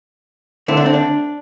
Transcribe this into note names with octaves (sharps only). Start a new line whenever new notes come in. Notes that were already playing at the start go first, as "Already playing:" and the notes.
D3 A3 C4 E4
D4
C4
D4